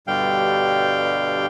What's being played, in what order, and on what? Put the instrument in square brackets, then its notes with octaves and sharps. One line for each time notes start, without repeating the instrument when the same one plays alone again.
[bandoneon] G2 B2 D3 G3 F5 G5